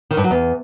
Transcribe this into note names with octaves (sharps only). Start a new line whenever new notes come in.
D#3
G2
F#3
E2